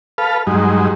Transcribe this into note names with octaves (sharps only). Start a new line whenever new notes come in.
A4 B4 F5
G2 F#3 G#3 D#4